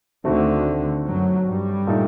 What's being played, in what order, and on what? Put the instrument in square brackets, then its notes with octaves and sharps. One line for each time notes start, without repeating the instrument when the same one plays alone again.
[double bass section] D2 D3 [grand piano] D#3 A3 C4 F#4
[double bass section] F#2 F#3
G2 G3
[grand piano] A#2 A3 D#4 A4